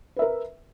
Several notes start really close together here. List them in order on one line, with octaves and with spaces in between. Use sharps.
B4 E5 A#4